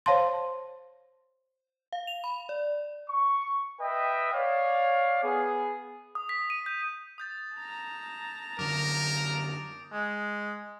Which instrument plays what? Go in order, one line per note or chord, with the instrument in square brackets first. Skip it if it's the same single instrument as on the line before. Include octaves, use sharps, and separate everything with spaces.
[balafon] C5 C#5 F5 A5 C6
[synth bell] F5
F7
B5
D5
[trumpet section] C#6
B4 D#5 E5 G5
C#5 D5 F5
B3 G#4
[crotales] D#6
B6
D#7
G6
D#6 G6 A6
[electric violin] A5 A#5
[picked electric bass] F#2 D3 [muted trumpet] A#4 [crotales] D6 F7
[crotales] D7
[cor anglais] G#3